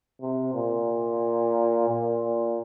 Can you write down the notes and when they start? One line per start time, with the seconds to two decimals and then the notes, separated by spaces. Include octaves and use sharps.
0.22 C3
0.55 A#2
1.89 A#2